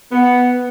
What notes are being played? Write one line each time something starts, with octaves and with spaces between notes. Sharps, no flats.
B3